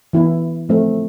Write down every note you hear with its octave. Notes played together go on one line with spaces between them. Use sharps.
E3 B3 E4
F3 A3 C4